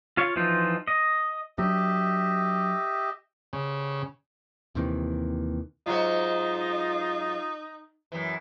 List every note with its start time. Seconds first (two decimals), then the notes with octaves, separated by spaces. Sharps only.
0.17 F4 C#5 F5
0.36 E3 F3 D#4 F4
0.87 D#5
1.58 F#3 D4 G4 D#5 E5
3.53 C#3
4.75 D#2 C3 D#3 E3
5.86 G#2 F#3 D#4 F4 F#4
8.12 F#2 E3